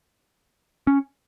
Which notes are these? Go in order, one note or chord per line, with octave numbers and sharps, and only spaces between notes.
C#4